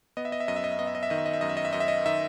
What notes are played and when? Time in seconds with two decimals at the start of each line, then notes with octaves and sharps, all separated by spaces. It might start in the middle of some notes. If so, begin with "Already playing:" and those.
0.17 B3 D#5
0.25 E5
0.32 D#5
0.40 E5
0.48 F#2 D#5
0.56 E5
0.64 D#5
0.72 E5
0.79 B3 D#5
0.87 E5
0.95 D#5
1.03 E5
1.10 D#3 D#5
1.18 E5
1.26 D#5
1.33 E5
1.41 F#2 D#5
1.49 E5
1.57 D#5
1.65 E5
1.73 F#2 D#5
1.80 E5
1.88 D#5
2.06 D#3 E5